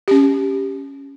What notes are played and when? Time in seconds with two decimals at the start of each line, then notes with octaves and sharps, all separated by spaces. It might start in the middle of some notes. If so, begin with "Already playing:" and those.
0.08 C#4 G4